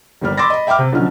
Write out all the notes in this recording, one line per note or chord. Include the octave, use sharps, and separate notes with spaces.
G1 D#2 G3 F6
B5 C6 D6 E6 A6 A#6
D#5 B5
E5 G5 B5 D6 F6
C3
B1 D3 F3 C#4 F6